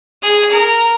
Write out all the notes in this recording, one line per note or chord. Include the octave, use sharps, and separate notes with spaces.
G#4
A#4